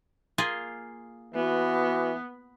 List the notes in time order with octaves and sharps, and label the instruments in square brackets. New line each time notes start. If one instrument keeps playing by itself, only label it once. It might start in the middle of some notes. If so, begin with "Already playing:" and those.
[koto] A#3 F4 G#4
[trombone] E3 [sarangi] B3 [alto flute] F#4